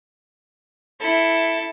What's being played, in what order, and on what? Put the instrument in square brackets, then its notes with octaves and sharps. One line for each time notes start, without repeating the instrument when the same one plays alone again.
[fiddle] E4 A4